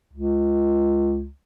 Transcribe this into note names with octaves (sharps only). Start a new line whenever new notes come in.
C#2